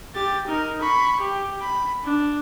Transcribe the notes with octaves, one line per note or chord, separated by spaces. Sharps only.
G4 A6
D#4 A#4
B5 C#6
G4
B5
D4